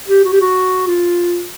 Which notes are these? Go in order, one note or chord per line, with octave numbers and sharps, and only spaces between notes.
G4
F#4
G4
F#4
F4